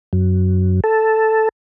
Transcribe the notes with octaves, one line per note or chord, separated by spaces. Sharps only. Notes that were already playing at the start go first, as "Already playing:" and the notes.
F#2
A4